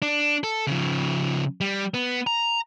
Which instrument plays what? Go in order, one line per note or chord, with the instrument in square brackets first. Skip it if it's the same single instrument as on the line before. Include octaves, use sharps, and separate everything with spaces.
[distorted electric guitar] D4
A4
C#3 F3
G3
B3
A#5